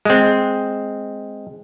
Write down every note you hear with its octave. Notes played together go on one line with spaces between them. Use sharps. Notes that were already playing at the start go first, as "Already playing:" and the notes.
G#3 C4